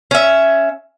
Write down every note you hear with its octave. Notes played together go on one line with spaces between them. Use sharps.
C#4 E5